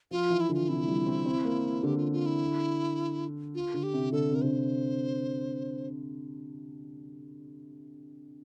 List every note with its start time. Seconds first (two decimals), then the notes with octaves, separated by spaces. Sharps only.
0.11 F3 F4
0.30 E3
0.40 E4
0.49 D3 F4
0.68 C3 E4
0.87 G3
1.06 C4
1.26 C4
1.45 A#3
1.83 D3 G4
1.98 F4
2.12 F4
2.26 E4
3.55 F4
3.74 D3
3.83 G4
3.93 C3
4.12 D3 A4
4.32 C3 A#4
4.42 D3 C5
4.51 C3